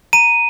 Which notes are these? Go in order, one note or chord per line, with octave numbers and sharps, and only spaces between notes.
A#5 D#7